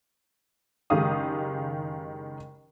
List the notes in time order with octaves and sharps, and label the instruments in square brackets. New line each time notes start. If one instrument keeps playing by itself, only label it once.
[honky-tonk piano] F#1 D#3 G#3 G4 F5 D#6